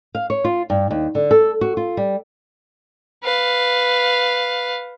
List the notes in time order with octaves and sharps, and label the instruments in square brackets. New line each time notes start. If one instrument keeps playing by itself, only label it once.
[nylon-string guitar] F5
C#5
F4
G2
D#2
D3
A4
F#4
F4
G3
[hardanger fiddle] B4 F5